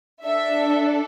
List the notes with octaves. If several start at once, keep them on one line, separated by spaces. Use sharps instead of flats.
D4 A4 E5